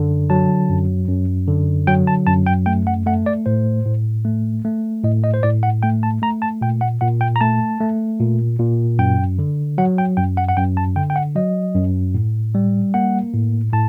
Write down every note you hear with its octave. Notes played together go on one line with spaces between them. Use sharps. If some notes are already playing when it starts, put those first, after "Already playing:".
Already playing: F#2 D3
F#3 A5
F#2
F#2
D3
F#3 G5
A5
F#2 A5
G5
A3 G5
F#5
A3 F#5
D5
A2 C5
A2
A3
A3
A2 D#5
D#5
C5
A2 D5
F#5
A3 G5
A5
A3 A#5
A5
A#2 G5
F#5
A#2 F#5
G5
A#5
A3 A5
A3
A#2
A#2
F#2 G5
D3
F#3 F#5
G5
F#2 G5
F#5
F#5
F#2 G5
A5
D3 G5
G5
F#5
F#3 D#5
F#2
A2
G3
A#3 F#5
A2
A2 A5